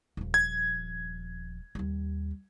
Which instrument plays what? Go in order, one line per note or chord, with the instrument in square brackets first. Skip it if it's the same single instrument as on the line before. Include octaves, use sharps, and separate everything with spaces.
[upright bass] D#1 F3
[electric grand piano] G#6
[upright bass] D#2 G3